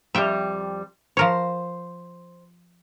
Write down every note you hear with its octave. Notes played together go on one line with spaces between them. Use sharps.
F2 G3 E5 G5
F3 A#4 C5 C#5